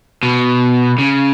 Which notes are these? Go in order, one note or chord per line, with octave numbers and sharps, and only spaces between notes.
B2
C#3